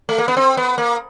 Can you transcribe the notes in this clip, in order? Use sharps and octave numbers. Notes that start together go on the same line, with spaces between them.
A3
A#3
B3
C4
B3
A#3